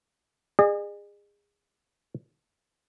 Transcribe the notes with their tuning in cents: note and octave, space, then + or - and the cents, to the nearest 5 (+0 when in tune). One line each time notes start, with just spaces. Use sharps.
G#4 -25 D#5 -45